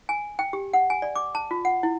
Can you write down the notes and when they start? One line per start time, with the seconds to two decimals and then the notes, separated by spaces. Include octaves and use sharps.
0.09 G#5
0.39 G5
0.53 G4
0.73 F#5
0.90 G#5
1.02 D5
1.16 D6
1.35 A5
1.51 F4
1.65 F#5
1.83 E4